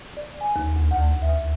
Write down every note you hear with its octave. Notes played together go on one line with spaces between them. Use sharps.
D5
G#5
D#2
D2
F#5
E5